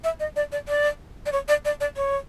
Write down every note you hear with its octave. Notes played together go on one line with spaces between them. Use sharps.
E5
D#5
D5
D5
D5
D5
C#5
D5
D5
D5
C#5